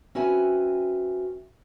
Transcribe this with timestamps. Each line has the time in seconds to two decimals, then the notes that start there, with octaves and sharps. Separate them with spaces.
0.15 C4 C#4 F#4 B4 E5 G#5